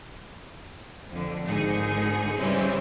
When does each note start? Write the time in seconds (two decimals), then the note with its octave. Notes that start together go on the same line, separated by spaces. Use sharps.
1.11 F2 D3
1.45 G#1 G#2 D3 D#4 G#4 C#7
2.36 C#3 E3 G3 G#3 C4 C#4